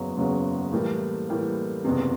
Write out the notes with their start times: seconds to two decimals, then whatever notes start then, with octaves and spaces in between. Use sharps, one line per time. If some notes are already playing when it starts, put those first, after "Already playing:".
Already playing: F#1 E2 C#3 F#3
0.17 F#1 E2 C#3 F#3
0.72 A2 E3 G3 A#3
1.29 A2 E3 G3 A#3
1.84 F#1 E2 C3